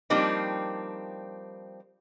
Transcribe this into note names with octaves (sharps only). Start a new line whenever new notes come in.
F3 G3 A#3 C4 D4 D#4